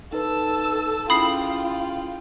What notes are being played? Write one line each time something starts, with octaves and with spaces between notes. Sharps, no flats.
D#4 A4 B4 E6
C#4 E4 F4 G#4 G5 B5 D#6 C7